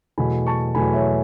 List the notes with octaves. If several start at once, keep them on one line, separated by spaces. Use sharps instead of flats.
E2 B2 F#3 A3 G#5 B5
A5 C#6
E2 B2 F#3 A3 G#5 B5
C#5 E5